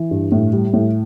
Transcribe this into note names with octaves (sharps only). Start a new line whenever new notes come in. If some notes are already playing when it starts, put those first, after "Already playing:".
Already playing: E3
G2
A2
G3
A2